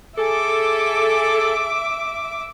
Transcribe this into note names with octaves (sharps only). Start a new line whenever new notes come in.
G#4 A4 E5 D6